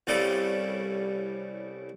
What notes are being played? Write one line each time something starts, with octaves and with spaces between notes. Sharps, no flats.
C2 A2 C#3 G3 A4 C6